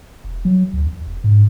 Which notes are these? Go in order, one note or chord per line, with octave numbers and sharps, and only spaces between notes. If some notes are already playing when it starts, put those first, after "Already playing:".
E1
F#3
D2
E2
E1
G#2